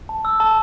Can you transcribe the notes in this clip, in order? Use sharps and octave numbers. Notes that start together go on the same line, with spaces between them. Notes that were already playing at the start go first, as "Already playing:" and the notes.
A5
E6
A5